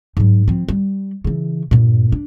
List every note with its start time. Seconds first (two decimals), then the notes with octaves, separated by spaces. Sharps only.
0.17 G#2 F#3
0.48 F3 C4
0.68 G3
1.24 C#3 E3
1.71 G2 A#2
2.12 D4